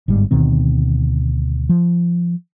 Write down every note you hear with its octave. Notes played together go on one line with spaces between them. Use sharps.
G1 G#2 G3
D2 B2 D#3 C4
F3